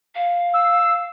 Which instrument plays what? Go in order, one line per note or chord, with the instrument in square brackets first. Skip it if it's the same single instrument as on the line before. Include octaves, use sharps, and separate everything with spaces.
[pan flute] F5
[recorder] E6